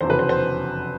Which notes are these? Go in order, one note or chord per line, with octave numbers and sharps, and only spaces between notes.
F1 E2 C#3 F#3 C5
B4
C5
C5